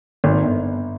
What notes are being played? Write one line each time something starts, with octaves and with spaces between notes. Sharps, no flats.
G#1
G1